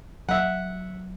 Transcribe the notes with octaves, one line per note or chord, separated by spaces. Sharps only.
F#3 E5 F#5